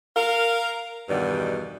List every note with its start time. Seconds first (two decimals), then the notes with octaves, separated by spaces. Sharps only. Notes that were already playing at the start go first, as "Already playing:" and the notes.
0.16 A#4 F5
1.09 E2 G2 B2 D#3 D5